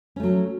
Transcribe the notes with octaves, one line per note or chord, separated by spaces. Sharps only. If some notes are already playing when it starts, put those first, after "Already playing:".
F#3 A3 C#4